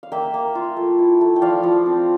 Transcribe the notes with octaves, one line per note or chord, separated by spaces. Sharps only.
F5
A#3 E5 G5
A#3
F4
A3
E4
A3
G5
F3 D5 F5
F3
C4